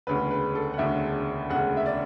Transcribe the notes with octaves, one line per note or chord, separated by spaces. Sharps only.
E1 D2 C#3 B4
B4
A4
F#5
E1 D2 C#3 E5
E1 D2 C#3 F#5
E5
D5